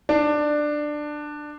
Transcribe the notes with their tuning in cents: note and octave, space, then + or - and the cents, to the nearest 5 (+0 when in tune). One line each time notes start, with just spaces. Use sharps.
D4 +15